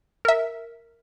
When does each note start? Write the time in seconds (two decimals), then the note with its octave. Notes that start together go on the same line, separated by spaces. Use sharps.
0.25 A#4 E5